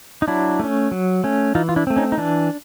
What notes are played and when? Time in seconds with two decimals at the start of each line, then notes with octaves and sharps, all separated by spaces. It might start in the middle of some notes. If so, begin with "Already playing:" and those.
0.22 D#4
0.28 F#3 D4 E4
0.59 A3 C#4
0.91 F#3
1.24 A3 C#4
1.55 E3 D#4 F4
1.69 F4
1.76 D4 E4
1.87 A3 C4
1.96 C#4 D#4
2.12 D#4
2.18 E3 D4